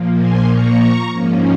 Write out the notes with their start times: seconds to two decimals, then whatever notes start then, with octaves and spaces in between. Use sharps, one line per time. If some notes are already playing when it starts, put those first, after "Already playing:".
Already playing: A#2 F3 A#3
0.16 G#5 C6
0.49 A#5 C#6
1.13 G#2 F3 A#3 C#4